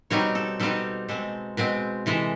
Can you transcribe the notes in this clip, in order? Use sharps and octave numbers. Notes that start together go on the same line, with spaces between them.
B2 G3 C4 D#4 C#5
A4
B2 G3 C4 D#4 A4
B2 G#3 C4 A4
B2 G#3 C4
C3 E3 G#3 A4